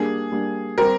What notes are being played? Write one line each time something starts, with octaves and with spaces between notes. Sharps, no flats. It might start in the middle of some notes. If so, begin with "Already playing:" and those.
Already playing: G3 A#3 D4 G#4
G3 A#3 D4
G3 C4 G4 A#4 C5